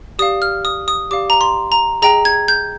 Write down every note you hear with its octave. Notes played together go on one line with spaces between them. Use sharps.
G4 D5 F5 D#6
F6
D#6
D#6
G4 D5 F5 D6
A#5
C6
A#5
G#4 D#5 G5 A#5
G#6
G6